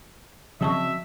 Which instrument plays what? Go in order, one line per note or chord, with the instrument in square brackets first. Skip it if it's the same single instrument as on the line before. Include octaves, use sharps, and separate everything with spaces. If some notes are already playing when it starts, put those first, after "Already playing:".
[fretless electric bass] C#3 F#3 C4 [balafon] F3 A5 C#6 [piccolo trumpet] E5